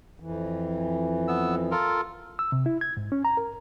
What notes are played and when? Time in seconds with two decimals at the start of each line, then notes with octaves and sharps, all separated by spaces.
0.20 F2 E3
1.28 B3 E6
1.71 F4 A4 A#4
2.39 E6
2.52 C3
2.66 E4
2.81 G#6
2.97 G#2
3.12 C#4
3.25 A#5
3.37 A#4